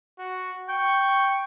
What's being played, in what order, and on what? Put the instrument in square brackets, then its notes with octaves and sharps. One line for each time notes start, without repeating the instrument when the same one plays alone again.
[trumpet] F#4
[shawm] G5 [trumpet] C#6